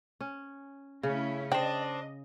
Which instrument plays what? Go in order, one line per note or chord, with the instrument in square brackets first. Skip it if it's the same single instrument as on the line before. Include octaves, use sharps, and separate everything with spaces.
[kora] C#4
[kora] C#3 [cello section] A3 C#4 E4
[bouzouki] D4 C5 [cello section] D#5 [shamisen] G5